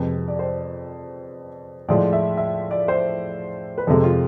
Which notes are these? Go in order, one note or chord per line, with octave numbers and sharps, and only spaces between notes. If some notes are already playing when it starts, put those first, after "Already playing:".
Already playing: F2 C3 G#3 B4
D5
C5
A2 F3 G#3 D5
E5
E5
D5
C5
B4
F2 C3 G#3 A4
F4